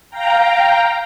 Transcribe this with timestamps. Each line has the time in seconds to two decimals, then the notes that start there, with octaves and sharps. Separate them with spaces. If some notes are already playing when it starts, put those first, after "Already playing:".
0.10 F5 G5 A#5